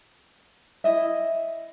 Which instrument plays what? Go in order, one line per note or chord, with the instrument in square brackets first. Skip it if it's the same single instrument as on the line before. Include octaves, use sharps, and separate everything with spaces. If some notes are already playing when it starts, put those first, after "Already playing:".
[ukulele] E4 D#5 E5